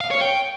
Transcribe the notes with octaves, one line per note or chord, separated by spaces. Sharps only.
F5
C#5
G5